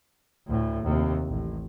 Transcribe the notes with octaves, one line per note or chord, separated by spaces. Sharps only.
D2 A2
D#2 C3
A1